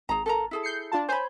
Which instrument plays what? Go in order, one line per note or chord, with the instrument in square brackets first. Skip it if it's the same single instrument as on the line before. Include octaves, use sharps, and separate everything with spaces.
[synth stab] G#1 [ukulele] G#4 A#5
[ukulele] A4 A#4 A#5
E4 G#4 A4
[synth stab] G6 C7 C#7
D4 F4 A5
[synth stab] C5 G#5 G6 [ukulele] C#5 B5